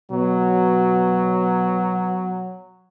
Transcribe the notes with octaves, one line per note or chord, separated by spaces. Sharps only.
B2 F#3